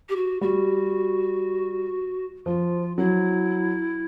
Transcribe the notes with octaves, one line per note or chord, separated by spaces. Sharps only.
G4
F#4
G3 F#4
F3 F4
F#3 E4